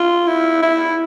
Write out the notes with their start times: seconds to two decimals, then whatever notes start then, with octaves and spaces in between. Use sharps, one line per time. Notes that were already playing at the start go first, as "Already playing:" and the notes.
Already playing: F4
0.27 E4
0.62 E4